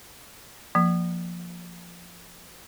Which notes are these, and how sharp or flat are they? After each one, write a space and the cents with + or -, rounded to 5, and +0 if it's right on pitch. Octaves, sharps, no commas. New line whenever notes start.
F3 +0 A#3 +0